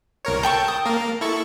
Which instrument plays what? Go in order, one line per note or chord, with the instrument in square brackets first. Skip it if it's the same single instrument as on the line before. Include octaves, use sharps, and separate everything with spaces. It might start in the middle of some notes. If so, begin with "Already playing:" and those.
[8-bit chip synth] C2 A#4 C#5
[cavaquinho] A4 G5 C#6 [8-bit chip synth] A5 G6
[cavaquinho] D#6
[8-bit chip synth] A#3 A#4
E4 A4 C#6